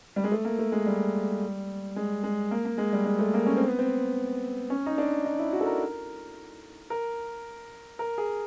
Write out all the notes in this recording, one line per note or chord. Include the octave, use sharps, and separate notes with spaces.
G3
G#3
A3
A#3
A3
G#3
G3
G#3
G#3
A#3
A#3
G#3
G3
G#3
A3
A#3
C#4
C4
B3
C4
C#4
D#4
D4
D#4
E4
F#4
A4
A#4
A#4
A#4
G#4